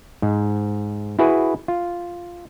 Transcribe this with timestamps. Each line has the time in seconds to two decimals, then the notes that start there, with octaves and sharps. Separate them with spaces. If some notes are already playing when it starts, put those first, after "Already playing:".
0.22 G#2
1.19 E4 F#4 G#4 B4
1.68 F4